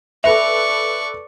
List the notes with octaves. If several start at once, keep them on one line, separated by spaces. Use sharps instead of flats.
A4 B4 D5 E5 C#6 F7